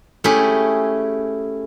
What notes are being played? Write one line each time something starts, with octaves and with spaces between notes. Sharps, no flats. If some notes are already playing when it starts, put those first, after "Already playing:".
A3 C#4 E4 G4 G#4